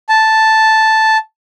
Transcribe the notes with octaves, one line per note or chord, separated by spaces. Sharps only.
A5